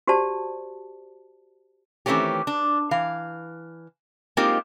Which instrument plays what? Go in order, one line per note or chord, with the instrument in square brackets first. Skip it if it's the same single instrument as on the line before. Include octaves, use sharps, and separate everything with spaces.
[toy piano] F#4 G4 C5 D5 A5
[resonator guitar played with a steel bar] D#3 E3 A3 C4 C#4 G4
D4
E3 F5
G#3 A#3 C4 D#4 F4 G4